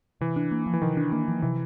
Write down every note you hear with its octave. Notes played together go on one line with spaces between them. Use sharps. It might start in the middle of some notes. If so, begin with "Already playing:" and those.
C3 E3
D4
A#3
F3
E3
C3 D#3
D4
D#3 A#3
F3
C3 E3